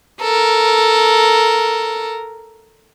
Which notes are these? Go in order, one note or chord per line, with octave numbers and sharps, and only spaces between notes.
A4 A#4